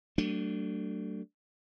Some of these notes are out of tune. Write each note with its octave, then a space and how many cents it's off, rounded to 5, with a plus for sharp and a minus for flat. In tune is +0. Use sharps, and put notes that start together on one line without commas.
F#3 +45 A3 +25 D4 +0